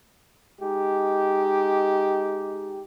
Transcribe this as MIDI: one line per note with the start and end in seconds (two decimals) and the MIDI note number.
0.61 2.83 56
0.61 2.83 63
0.61 2.83 67